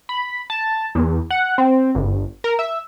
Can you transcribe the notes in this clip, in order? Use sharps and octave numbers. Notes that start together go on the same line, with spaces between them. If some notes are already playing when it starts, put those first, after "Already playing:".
B5
A5
E2
F#5
C4
G1
A#4
E5